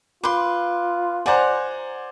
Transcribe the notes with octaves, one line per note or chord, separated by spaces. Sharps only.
F4 B4 C6 D6
C5 D5 F#5 G#5 A#5